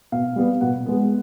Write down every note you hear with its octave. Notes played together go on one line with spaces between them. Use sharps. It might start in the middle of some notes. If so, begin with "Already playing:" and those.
B2 F5
G3 B3
B2 F#5
G#3 B3